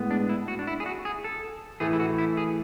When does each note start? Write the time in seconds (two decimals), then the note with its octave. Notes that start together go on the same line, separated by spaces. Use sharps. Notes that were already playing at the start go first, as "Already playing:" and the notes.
Already playing: A2 G#3 B3
0.11 D4
0.29 E4
0.48 F#4
0.59 D4
0.67 E4
0.80 G#4
0.86 F#4
1.05 G#4
1.24 A4
1.80 A2 E3 A3 G#4
1.93 E4
2.00 F#4
2.18 E4
2.37 G#4